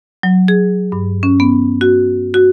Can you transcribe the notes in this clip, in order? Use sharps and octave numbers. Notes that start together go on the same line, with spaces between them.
F#3
G#4
G2
C#4
B3
F#4
F#4